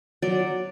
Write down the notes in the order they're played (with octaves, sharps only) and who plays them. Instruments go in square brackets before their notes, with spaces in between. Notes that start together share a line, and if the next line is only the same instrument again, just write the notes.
[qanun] F#3 D5